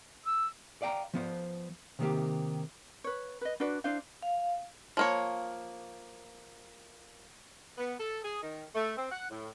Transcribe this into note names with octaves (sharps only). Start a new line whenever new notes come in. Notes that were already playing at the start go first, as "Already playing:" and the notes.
E6
D5 F5 G5 A#5
F3 B3 C5
C3 D#3 A#3 G4
B4 C#5
B4 D#5
D4 F#4 B4 D5
D4 E4 C5 F5
F5
F3 A#3 C#5
B3
A4
G#4
D#3
A3
C4
F#5
A2